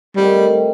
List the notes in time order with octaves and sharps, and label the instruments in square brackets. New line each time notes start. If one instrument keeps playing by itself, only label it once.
[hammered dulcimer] D#3 A3 C4 F#4 [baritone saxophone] G3